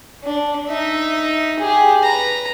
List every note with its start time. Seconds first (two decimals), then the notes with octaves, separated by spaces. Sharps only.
0.24 D4
0.68 D#4 E5
1.59 G4 G#4
2.03 B4 A#5